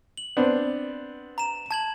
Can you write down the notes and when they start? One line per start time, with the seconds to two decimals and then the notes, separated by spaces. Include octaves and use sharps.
0.17 F#7
0.37 B3 C4 D4
1.38 A#5 E7
1.71 A5 G#6 F#7